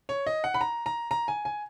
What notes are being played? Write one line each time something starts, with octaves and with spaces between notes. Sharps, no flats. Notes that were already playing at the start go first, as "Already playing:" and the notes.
C#5
D#5
F#5
B5
A#5
A#5
A#5
G#5
G#5